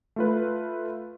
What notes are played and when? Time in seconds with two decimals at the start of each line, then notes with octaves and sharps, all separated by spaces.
0.16 A3 F4 B4